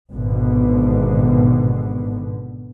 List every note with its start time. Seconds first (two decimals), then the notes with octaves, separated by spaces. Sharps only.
0.12 G#1 B2 D3